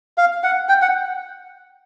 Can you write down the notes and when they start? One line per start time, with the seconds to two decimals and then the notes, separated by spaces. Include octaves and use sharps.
0.18 F5
0.43 F#5
0.69 G5
0.82 F#5